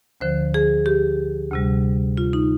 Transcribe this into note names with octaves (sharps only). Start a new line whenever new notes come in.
D2 D3 F3 C5
G#4
G4
D2 C3 G3
F4
D#4